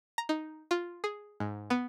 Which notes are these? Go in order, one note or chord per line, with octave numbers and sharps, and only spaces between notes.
A#5
D#4
F4
G#4
G#2
B3